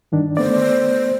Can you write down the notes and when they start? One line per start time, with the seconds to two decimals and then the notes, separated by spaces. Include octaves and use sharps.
0.12 G2 D#3 D4
0.37 A3 B3 C5 D5